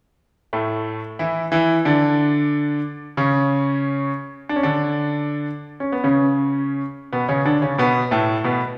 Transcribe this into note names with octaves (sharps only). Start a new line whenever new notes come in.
A2 A3
E3 E4
E3 E4
D3 D4
C#3 C#4
D4
C#4
D3 D4
C#4
B3
C#3 C#4
B2 B3
C#3 C#4
D3 D4
C#3 C#4
B2 B3
A2 A3
B2 B3